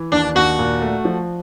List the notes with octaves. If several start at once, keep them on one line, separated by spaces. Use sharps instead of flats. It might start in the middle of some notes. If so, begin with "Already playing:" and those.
Already playing: E3
D#2 D4
D#2 F#4
A#2
A3
F3